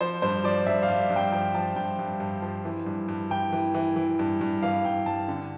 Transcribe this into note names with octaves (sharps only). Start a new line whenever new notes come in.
F3 C5
G2 C5
F3 D5
G2 E5
F5
G2
G2
G5
F3 G5
F3 A5
G2 G5
G2
G2
F3
E3
G2
G2
E3 G5
E3
E3
E3
G2
G2
E3 F5
G2 G5
G2 A5
D3